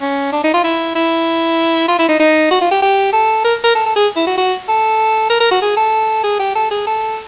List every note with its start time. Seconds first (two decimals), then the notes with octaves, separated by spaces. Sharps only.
0.01 C#4
0.32 D4
0.44 D#4
0.54 F4
0.64 E4
0.95 E4
1.88 F4
1.99 E4
2.09 D#4
2.19 D#4
2.51 F#4
2.61 F4
2.71 G4
2.82 G4
3.13 A4
3.44 A#4
3.64 A#4
3.75 A4
3.86 A4
3.96 G#4
4.16 E4
4.27 F#4
4.37 F#4
4.69 A4
5.30 A#4
5.40 A#4
5.51 F#4
5.62 G#4
5.77 A4
6.24 G#4
6.39 G4
6.55 A4
6.71 G#4
6.87 A4